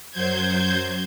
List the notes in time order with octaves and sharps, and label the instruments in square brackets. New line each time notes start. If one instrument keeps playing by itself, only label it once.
[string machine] F#2 F#3 C5 G6 G#6